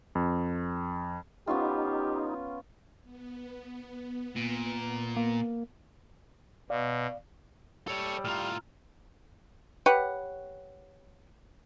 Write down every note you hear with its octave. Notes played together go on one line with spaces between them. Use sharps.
F2
B3 C#4 D#4 F4 G4
B3
A#2
A#3
B2 D5 F5
G3 A4 C#5 E6
A2 F4 A#5 F6
G4 B4 C#5 F#5